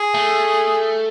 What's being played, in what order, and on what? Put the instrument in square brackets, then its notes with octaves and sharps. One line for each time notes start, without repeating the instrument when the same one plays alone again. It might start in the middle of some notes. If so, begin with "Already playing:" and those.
Already playing: [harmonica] G#4
[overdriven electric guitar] A3